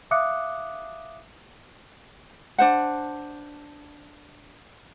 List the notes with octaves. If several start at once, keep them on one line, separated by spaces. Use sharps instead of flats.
E5 F5 D6 D#6 F#6 C#7
D4 C5 F#5